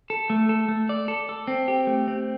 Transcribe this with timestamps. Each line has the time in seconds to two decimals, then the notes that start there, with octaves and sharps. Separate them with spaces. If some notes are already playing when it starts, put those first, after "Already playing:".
0.10 A4
0.30 A3
0.49 A4
0.68 A3
0.89 D5
1.08 A4
1.29 A4
1.48 C4
1.68 G4
1.87 A3
2.08 C4